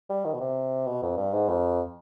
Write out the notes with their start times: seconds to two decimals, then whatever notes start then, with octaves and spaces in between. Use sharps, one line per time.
0.10 G3
0.25 D#3
0.34 B2
0.40 C3
0.87 B2
1.02 F2
1.17 G2
1.33 G#2
1.48 F2